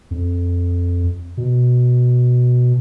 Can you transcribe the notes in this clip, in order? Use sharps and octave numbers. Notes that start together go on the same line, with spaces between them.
F2
B2